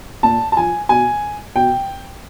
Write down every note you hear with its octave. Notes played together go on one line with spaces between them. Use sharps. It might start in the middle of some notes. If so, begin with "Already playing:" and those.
A#2 A5
A5
F3 G#5
B2 G#5
B2 G5